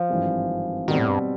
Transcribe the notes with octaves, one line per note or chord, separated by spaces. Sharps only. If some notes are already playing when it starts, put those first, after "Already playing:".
Already playing: F3
G#1 G2 E3 G3 C4
B2 D#3 G3 C4
A2
G2